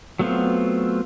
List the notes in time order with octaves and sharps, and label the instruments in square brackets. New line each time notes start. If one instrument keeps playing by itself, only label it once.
[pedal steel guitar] F#3 A3 B3 C4 F4